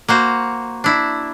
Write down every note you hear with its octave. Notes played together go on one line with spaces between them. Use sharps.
A#3 F#4 C5
D4 E4